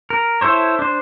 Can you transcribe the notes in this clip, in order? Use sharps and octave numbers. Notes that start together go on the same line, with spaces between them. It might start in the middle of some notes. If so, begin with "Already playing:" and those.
A#4
E4 A4 C5 C#5
D4 C5